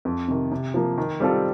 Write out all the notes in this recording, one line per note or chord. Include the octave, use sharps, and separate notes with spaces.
F2
C3 D#3
C3
F3 A#3
D#3
G3 C4 F4 A4